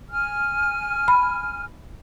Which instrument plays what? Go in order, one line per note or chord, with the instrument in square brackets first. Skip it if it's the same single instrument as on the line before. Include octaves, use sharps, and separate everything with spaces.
[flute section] G#5 F6
[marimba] B5